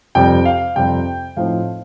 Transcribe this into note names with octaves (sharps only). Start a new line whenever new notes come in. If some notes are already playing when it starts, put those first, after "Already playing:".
F2 C3 G3 G5
F5
F2 C3 G3 G5
A2 F3 C4 D#4 F5